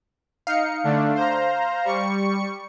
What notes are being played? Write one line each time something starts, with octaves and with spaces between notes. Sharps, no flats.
D#4 F5 C#7
D3 A3 D4
C5 A#5
G3 C#6 C#7